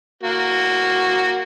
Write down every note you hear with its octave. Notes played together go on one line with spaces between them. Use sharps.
A#3 F#4